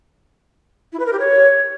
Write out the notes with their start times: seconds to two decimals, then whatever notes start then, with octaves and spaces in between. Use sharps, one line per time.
0.93 E4
0.99 B4
1.06 A#4
1.13 G4
1.19 C#5